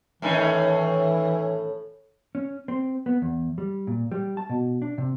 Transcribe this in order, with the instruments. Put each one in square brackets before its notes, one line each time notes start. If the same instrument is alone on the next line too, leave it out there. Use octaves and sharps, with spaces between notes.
[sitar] A2 D#3 C#4 [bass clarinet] E3
[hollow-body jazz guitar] C#4
C4
B3
E2
G3
A#2
G3
A5
B2
D4
C3